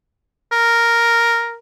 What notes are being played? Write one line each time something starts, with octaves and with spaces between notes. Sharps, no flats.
A#4